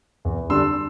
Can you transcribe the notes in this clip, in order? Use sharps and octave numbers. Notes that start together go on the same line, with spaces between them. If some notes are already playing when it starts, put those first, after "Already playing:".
E2
D3 G3 D4 C6 E6